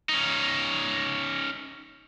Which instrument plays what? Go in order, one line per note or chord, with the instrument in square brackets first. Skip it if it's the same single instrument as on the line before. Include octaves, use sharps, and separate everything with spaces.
[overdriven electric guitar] C#4 D#4